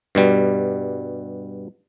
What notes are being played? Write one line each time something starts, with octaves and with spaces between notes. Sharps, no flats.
G2 B2 G3